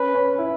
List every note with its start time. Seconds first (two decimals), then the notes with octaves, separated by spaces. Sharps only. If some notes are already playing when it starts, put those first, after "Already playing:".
Already playing: C#4 B4
0.14 C#4
0.38 E4